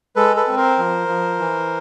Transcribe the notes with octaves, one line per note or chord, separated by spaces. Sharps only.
G#3 A4 B4
A4 B4
C4
A#4 C5
F3
F3
E3